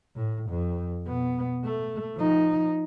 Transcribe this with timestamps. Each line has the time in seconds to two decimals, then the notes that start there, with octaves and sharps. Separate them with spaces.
0.16 A2
0.50 F2
1.06 B2 B3
1.64 A3
2.16 F3 D#4